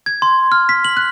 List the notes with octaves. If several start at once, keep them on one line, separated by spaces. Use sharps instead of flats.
G#6
C6
F6
B6
F#7
F#6